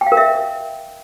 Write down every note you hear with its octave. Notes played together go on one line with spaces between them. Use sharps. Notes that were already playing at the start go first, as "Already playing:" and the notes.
G5
F5
A#4
E5